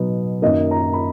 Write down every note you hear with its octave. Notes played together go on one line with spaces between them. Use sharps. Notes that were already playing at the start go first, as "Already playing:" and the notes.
Already playing: B2 F#3 B3 D#4
F#2 D#3 A#3 D#5
A#5
B5